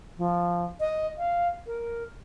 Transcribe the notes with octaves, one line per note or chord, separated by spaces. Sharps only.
F3
D#5
F5
A#4